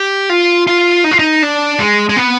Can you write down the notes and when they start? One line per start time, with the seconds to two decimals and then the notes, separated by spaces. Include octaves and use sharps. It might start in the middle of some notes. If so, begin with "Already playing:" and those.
Already playing: G4
0.29 F4
0.67 F4
1.04 D#4
1.11 F4
1.19 D#4
1.43 D4
1.80 G#3
2.09 G#3
2.16 B3